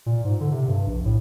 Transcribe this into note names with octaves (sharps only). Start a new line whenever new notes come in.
A#2
G#2
D3
C3
G2
A#1
A2